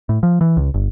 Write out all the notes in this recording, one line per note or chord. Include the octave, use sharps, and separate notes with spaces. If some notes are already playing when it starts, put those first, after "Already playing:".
A2
F3
E3
C#2
G1